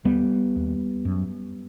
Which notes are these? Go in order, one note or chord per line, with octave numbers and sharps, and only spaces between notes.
D#2 G3 B3
D#2
F#2